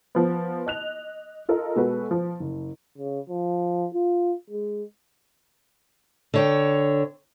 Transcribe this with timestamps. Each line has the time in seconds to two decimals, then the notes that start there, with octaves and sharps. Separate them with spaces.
0.15 F3 B3
0.66 D#5 F#6 F7
1.49 F4 A4 A#4 D#5
1.76 B2 G#3 B3 F#4 A4 B4
2.11 F3
2.40 F#1
2.98 C#3
3.29 F3
3.94 F4
4.50 G#3
6.34 D3 C#5 G5